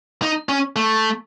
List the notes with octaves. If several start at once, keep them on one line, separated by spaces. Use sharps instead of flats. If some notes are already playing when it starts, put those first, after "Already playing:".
D#4
C#4
A3